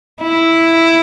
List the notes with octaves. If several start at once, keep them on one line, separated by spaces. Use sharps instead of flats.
E4